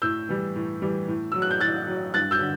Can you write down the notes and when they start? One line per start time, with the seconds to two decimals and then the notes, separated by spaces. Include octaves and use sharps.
0.02 A2 E6 G6
0.29 E3 G3
0.56 A2
0.82 E3 G3
1.08 A2
1.32 F#3 E6
1.42 F#6
1.51 G6
1.61 A2 F#6 A6
1.87 F#3
2.14 G2 F#6 A6
2.31 E6 G6
2.40 D3